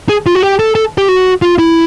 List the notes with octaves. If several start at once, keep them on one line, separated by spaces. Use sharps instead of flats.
G#4
F4
F#4
G4
A4
A4
G4
F#4
F4
E4